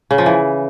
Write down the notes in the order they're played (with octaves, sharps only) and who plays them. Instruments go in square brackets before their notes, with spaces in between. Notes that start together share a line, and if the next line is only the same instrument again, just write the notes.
[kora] C#3
F3
E3